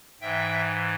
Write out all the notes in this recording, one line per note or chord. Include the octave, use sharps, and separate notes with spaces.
G#2 E3 E5 G5